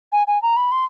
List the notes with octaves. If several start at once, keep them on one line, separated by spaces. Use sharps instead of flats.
G#5
G#5
A#5
B5
C6